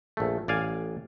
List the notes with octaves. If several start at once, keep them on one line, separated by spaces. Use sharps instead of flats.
A#1 A3
A1 D5 F5 G#5